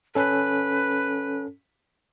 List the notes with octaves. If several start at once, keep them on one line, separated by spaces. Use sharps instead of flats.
C#4 A4 B4